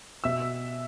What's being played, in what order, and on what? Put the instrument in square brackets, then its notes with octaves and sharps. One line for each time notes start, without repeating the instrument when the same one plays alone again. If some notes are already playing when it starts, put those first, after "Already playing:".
[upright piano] B2 E5 E6